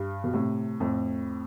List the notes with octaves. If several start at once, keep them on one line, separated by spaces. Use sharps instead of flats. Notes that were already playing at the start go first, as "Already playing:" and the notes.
Already playing: G2
B2
A2 C3
F2 A2